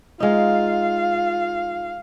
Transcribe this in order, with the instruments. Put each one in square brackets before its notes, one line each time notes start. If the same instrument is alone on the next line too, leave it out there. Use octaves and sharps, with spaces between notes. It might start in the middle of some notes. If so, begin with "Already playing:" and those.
[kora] G#3 D#4 [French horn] F4 [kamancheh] F5